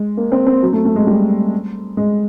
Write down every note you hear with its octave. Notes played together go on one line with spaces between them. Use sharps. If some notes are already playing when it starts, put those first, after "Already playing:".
Already playing: G#3
A#3
C4
C4
F#3
A3
A3
G#3
G3
G#3